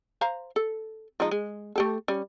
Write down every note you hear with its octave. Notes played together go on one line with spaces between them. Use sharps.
C5 F5 A#5
A4
F3 G#3 D#4
G#3
A3 G4 A4
G3 C#4